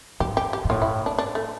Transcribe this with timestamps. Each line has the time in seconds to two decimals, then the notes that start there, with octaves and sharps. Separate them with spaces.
0.20 G#2 G4
0.37 G4
0.53 G4
0.65 G#2
0.69 A2 F4
0.82 E4
1.06 D4
1.18 D4
1.35 A3